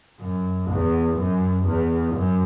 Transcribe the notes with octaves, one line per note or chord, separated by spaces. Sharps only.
F#2
E2
F#2
E2
F#2